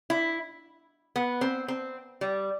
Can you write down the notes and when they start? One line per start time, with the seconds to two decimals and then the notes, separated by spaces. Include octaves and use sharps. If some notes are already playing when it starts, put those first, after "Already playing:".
0.10 E4
1.16 B3
1.41 C4
1.68 C4
2.21 G3